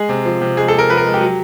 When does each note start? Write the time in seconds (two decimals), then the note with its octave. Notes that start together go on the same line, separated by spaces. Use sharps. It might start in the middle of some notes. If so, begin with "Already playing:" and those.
Already playing: G#3 G#4
0.09 C3
0.25 F3
0.41 C3
0.57 G#3 G#4
0.68 A4
0.73 C3
0.78 A#4
0.89 F3 B4
0.97 A#4
1.06 G#3
1.14 G4
1.21 F#3